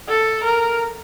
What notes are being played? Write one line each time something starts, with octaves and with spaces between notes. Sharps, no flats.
A4
A#4